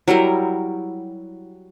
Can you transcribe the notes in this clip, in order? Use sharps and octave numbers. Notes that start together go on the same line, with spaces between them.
F#3 G3 E4 A#4